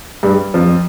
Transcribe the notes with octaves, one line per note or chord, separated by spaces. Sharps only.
G2 G3
F2 F3